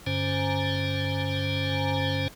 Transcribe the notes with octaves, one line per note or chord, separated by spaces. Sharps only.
G2 D3 C#4 C5 G#5 A#5